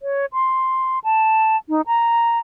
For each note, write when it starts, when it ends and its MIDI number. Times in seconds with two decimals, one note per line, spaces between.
0.02 0.26 73
0.33 0.99 84
1.04 1.57 81
1.69 1.81 63
1.87 2.39 82